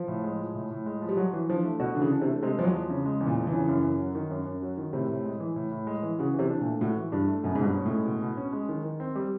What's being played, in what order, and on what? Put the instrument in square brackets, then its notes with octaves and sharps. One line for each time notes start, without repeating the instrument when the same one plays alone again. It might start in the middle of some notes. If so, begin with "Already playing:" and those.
Already playing: [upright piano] F3
[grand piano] A2
G#3
F3
A2
A2
G#3
F3
[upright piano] G3
[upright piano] F#3 [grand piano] F#4
[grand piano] E3
[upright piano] F3 [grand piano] D4
[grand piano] A3
[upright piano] B2 [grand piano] F#4
[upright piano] D3 [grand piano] E3
[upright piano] C#3
[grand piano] D4
[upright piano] C3
[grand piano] A3
[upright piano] C3 [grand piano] G#3
[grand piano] E2 [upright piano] F3
[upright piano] F#3
[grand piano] F3
C#3
G#3
E2
[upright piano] A#2
[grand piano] F3
[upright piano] E3
[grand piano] C#3
F#2
F#2
F#3
D#3
F#2
F#2
F#3
D#3
[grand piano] A2 [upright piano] C3
[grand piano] A2
G#3
E3
A2
A2
G#3
E3
[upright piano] C#3 [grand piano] F#4
[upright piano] C3 [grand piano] E3
[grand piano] D4
[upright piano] A#2
[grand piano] A3
[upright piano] A2 [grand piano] F#4
[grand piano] E3
[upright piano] G2 [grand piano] D4
[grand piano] A3
[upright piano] F#2 [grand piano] B2
[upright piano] G#2
[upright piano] G2 [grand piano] B2
[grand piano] C#4
[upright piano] A2 [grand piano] G#3
[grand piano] B2
B2
C#4
G#3
D#3
D#3
C4
G3